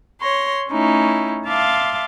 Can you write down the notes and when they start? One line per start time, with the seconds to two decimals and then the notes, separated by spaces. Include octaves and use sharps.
0.21 C#5 C6 A#6
0.70 A3 C#4 D#4 E4
1.47 E5 F5 A5 C6 D6